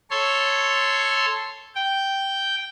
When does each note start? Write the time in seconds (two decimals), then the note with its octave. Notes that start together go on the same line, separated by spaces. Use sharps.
0.11 A4 C#5 C6
1.75 G5